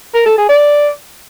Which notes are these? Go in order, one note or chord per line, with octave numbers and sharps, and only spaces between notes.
A#4
A4
G#4
D5